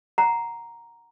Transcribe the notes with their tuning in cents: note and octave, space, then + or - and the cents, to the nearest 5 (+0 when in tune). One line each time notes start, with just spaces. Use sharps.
F#5 +0 A#5 +0